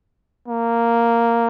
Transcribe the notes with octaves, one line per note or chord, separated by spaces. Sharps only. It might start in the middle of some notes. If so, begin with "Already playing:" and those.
A#3